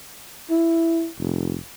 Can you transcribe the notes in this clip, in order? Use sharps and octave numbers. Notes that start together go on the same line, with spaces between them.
E4
F1